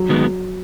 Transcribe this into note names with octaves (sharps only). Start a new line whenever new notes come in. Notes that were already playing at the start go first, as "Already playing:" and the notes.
Already playing: F#3
D#3 G#3 B3